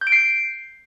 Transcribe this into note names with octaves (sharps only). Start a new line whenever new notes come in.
G6
D7
C7